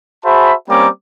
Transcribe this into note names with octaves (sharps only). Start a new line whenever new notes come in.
F#4 G#4 C5 E5 A5 B5
G3 A#3 C4 C#4 A#5 D6